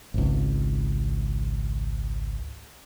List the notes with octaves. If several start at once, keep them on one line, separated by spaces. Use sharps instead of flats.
G#1 C#2